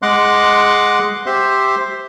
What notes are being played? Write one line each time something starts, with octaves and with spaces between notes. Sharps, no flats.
G#3 D#5 F#5 C6 D6 F#6
G4 C5 E5 C6